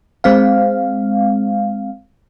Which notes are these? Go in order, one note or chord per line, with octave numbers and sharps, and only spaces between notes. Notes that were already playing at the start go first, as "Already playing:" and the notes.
G#3 C4 F5